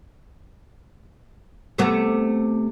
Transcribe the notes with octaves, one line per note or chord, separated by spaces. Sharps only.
C3 A3 B3